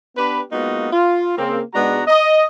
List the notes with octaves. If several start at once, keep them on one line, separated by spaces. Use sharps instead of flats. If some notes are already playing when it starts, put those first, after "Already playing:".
B3 D4 G4 B4
G#3 A#3 B3 D#4 F4 F#4
F4
C#3 A#3 C4
G#2 G#3 B3 D4 F#4 A#5
D#5